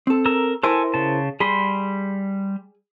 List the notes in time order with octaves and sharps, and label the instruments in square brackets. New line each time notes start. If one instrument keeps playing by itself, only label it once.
[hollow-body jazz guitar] C4 A4
[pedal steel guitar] A#4 E6
[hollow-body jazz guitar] E4 A#4 C5 [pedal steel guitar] A4 E5 G#5
[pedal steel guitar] C#3 A5
[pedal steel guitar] G3 B5 C6 [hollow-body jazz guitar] G#4